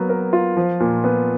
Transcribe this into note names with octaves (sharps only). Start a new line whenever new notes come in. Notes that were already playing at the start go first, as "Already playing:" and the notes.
Already playing: F#3 A#3 B3
A#4
F4
F3
A#2
B3